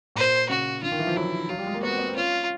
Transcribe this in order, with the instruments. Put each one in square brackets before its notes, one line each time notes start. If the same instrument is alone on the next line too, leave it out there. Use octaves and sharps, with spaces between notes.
[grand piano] A#2 [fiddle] C5
[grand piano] C#3 [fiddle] F#4
[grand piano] D3 [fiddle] F4
[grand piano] D#3
E3
F3
[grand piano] F#3 [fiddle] E4
[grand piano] F#3 [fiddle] F4
[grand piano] G3
G#3
A#3
[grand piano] B3 [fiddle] F#4
[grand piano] C4
B3
C4
[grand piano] C#4 [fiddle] F4